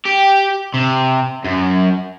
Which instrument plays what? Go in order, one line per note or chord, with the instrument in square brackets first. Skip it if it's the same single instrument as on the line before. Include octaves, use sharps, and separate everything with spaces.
[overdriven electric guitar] G4
C3
F#2